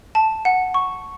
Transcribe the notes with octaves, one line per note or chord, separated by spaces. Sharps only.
A5
F#5
C#6